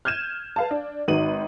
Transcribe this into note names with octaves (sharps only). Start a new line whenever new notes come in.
F6 G6 G#6 D#7 E7
B4 F5 A5
D4
G#1 D#3 F#4 B4 D#7 F#7